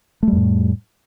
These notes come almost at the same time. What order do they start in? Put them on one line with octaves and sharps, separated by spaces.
A3 G3 F2 A2